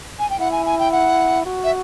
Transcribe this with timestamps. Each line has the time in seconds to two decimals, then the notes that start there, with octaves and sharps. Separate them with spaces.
0.19 G#5
0.30 G5
0.39 E4 F#5
0.52 G#5
0.66 G#5
0.79 G5
0.92 F#5
1.45 F#4
1.64 E5